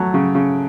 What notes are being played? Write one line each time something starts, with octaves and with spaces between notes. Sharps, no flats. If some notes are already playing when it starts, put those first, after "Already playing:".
Already playing: F#3 A3
C#3
C#3